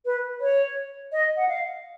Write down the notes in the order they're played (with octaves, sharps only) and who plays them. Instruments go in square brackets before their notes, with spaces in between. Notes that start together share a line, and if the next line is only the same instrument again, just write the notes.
[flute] B4
C#5
D#5
F#5
F5